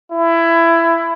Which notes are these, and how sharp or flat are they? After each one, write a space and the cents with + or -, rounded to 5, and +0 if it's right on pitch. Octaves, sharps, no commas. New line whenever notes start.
E4 +20